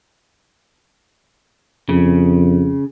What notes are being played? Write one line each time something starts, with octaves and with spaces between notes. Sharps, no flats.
F2 C#3